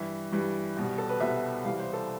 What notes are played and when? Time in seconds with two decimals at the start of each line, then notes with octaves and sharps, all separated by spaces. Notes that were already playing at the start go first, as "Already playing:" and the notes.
Already playing: G2 E3 G3 E5
0.32 G2 E3 G3
0.77 C2 B2 G3
0.98 A4
1.09 B4
1.20 C2 B2 G3 E5
1.64 C2 C3 E3 G3 F5
1.80 C5
1.93 A4